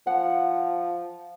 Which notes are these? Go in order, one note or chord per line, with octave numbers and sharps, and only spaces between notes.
F3 F#5